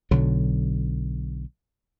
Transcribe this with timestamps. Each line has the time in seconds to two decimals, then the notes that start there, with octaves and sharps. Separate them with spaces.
0.11 B1 D3 F#3